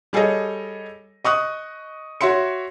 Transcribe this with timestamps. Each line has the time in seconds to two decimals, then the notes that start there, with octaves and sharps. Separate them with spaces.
0.13 G3 G#4 A4 C#5 D#5
1.24 D#5 C#6 D#6 F#6
2.21 F#4 C#5 E5 C6 C#7